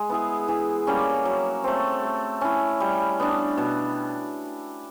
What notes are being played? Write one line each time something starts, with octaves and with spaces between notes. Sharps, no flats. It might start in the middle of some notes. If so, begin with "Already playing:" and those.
Already playing: G#3
B3 E4 G#4
E3
G3 A#3 C#4
F#3
A3 C4
A3
C#4 E4
G3
B3 D4
B2